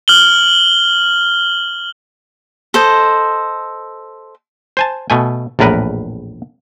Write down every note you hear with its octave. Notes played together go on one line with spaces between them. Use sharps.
F6 F#7 G7
A4 C5 D#5
C5 G#5 A5
B2 A3 G#5
A#1 E2 A2 A#4 B4